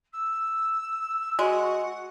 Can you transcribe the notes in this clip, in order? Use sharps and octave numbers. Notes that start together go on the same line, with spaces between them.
E6
G#3 F#4 F#5